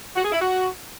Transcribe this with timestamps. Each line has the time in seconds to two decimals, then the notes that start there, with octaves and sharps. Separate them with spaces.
0.16 F#4
0.24 G#4
0.32 E4
0.40 F#4